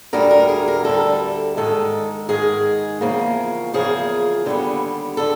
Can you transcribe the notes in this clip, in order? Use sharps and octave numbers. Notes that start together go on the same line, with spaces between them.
D2 D3 G3 A#4
A#4
G#4
A#4
D2 D3 G3 A4
G#2 D#3 G#3 A4
G#2 D#3 G#3 G#4
E2 C#3 F3 A#3
E2 C#3 F3 A#3 G#4
D#2 D3 G3 B3
D3 A4